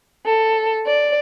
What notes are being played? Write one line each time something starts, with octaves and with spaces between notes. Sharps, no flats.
A4
D5